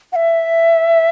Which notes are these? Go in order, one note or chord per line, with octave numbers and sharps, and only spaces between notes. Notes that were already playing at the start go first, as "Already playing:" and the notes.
F#5
E5